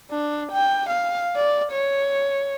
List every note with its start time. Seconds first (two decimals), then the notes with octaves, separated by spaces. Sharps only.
0.11 D4
0.52 G5
0.90 F5
1.36 D5
1.73 C#5